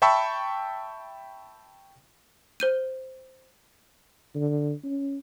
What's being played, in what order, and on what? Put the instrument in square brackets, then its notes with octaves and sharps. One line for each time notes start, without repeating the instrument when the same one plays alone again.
[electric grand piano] E5 G5 A5 B5 C#6 E6
[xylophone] C5 G6 D#7
[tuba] D3
C#4